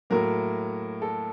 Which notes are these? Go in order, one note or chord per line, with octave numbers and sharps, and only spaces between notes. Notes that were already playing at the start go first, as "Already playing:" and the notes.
A2 F#3 A#3 A#4
A4